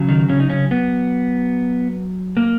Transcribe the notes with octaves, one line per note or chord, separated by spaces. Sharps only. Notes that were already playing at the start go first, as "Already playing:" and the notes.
Already playing: C#3 F#3
D#3 D#4
C#3 C#4
D#4
C#3 C#4
B3
A#3